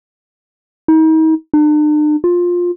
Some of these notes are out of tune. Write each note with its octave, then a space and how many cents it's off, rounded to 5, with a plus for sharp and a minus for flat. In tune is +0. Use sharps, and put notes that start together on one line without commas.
D#4 +40
D4 +45
F4 +15